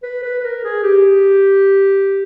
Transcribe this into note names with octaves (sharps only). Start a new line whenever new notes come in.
B4
B4
B4
A#4
G#4
G4